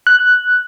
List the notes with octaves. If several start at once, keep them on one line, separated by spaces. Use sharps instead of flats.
F#6